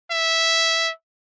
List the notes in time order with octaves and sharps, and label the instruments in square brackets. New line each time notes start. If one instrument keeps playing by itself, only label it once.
[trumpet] E5